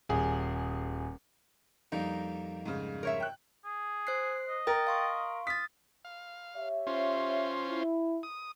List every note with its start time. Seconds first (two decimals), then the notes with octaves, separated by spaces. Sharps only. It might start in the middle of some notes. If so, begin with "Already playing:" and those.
0.09 D#1 G#4
1.92 F2 G3 A#3 D#4
2.65 G#2 C#3
3.03 A#4 C#5 E5
3.20 G5 F#6
3.65 G#4
4.07 C5 F#6 C7
4.49 D#5
4.67 A#4 G5 A6
4.87 F5 C6 C#6
5.47 F4 D#6 A6 B6
6.05 F5
6.55 G4 C#5 E5
6.87 C#4 F4 C5
7.69 E4
8.23 D#6